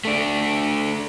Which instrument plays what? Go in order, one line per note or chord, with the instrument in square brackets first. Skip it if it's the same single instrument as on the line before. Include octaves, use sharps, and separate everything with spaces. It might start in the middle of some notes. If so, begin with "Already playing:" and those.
[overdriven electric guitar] A3 D4